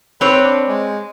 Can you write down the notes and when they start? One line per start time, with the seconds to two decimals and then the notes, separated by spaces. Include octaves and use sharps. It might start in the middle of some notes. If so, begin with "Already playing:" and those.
0.21 C4 B4 C#5
0.44 D4
0.68 G#3